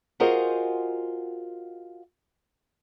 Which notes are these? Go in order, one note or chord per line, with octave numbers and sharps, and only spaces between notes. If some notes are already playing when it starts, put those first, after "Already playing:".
F4 F#4 G#4 A#4 C5 D#5